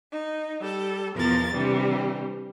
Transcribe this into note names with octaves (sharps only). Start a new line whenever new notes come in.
D#4
G3 A4
E2 B2 F3 A#4 A6
C3 E3 G3 D4